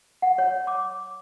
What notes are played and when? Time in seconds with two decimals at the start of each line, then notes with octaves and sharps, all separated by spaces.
0.22 F#5
0.38 C#5
0.67 D6